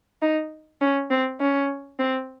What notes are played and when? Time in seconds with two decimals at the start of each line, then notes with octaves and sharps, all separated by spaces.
0.22 D#4
0.81 C#4
1.11 C4
1.40 C#4
1.99 C4